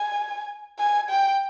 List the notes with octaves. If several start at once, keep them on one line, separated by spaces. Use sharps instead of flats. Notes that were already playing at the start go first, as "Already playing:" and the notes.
Already playing: G#5
G#5
G5